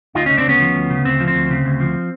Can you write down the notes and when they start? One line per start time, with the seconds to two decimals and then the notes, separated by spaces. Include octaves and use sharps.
0.15 D2 D#4 F4
0.26 C#3 C#4 D#4
0.37 C4 D4
0.45 D2 B3 C#4
0.60 F3
0.75 D2
0.90 C#3
1.05 D2 C4
1.20 F3
1.28 C4
1.35 D2
1.50 C#3
1.65 D2
1.80 F3